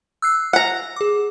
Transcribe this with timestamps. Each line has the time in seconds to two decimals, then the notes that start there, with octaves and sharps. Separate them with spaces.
0.22 E6 F#6 C7
0.53 F#5 A#5
0.96 G#4 D6